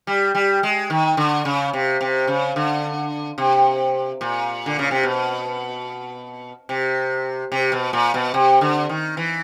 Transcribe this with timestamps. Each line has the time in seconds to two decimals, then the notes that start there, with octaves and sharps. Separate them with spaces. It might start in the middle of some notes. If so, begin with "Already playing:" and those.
0.07 G3
0.35 G3
0.63 G#3
0.90 D#3
1.17 D3
1.45 C#3
1.73 C3
2.01 C3
2.27 C#3
2.56 D3
3.38 C3
4.21 A#2
4.66 D3
4.79 C#3
4.91 C3
5.03 B2
6.69 C3
7.52 C3
7.72 B2
7.93 A#2
8.14 B2
8.34 C3
8.61 D3
8.89 D#3
9.17 E3